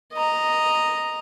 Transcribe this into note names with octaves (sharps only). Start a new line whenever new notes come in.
D#5 A#5